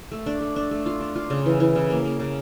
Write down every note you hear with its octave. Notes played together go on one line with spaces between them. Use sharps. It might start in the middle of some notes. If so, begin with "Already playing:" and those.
A3
D4
A3
D4
A3
F4
D4
F4
C#3
E3
E3
C#3
A#3
A#3
C#3